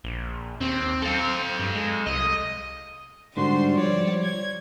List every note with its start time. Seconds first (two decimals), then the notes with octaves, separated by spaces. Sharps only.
0.04 A#1
0.61 D#2 C4
1.02 C4 A4 F5
1.59 G2
1.75 G#3
2.07 C2 D#5
3.37 G#2 D3 G3 F#4 C5 C6
3.76 F3 C#5 D5
4.23 G#6